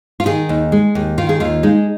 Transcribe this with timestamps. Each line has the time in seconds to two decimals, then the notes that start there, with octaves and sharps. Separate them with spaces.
0.20 F4
0.26 D#3 G#4
0.49 D#2
0.72 G#3
0.95 D#2
1.18 D#3 F4
1.29 G#4
1.40 D#2 F4
1.63 G#3 D#4